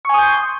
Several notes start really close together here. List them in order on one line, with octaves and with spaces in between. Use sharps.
C#6 G#5 D#6 G6 C6